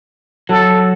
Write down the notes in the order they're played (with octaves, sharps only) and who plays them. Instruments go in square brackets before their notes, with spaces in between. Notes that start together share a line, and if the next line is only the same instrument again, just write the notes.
[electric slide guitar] F#3 [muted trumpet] A4